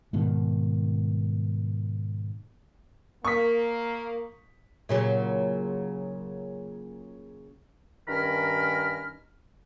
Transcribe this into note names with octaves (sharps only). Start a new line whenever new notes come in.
G#2 B2 D#3
A#3 C#6 D#6 B6
A#2 C#3 F#3
G2 D#3 C#4 A#4 B5 F6